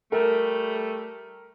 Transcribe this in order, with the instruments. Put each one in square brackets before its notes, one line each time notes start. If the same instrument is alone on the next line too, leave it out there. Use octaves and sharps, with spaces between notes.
[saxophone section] G3 A3 [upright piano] A#4